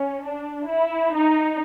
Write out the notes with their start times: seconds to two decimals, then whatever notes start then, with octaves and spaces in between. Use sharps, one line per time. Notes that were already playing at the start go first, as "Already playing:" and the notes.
Already playing: C#4
0.25 D4
0.68 E4
1.14 D#4